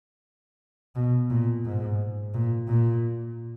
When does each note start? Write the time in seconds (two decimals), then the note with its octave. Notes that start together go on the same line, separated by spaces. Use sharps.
0.96 B2
1.31 A#2
1.65 G#2
2.34 A#2
2.69 A#2